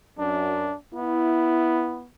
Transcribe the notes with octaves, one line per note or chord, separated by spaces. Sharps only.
F#2 D4
B3 E4